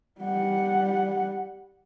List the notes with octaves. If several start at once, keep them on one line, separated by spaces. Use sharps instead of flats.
G3 F#5